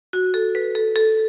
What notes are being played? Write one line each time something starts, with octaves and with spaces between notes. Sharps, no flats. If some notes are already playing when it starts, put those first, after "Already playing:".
F#4
A4
B4
A4
A4